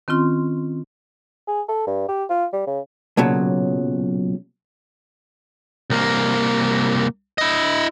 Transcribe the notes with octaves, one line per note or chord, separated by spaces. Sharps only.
D#3 C4 C#4 F4 C6
G#4
A4
G2
G4
F4
G3
C#3
B1 A#2 C#3 F#3
C2 A#3
E4 D#5